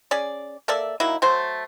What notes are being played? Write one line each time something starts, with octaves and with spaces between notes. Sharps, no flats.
C#4 G#4 D5
A#3 A4 D5 E5
F#3 A#3 D#4 E4
F#3 A3 C5